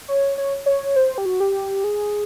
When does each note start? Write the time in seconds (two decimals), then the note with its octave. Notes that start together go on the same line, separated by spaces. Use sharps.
0.08 C#5
0.38 C#5
0.66 C#5
0.96 C5
1.18 G4
1.26 F#4
1.40 G4
1.84 G#4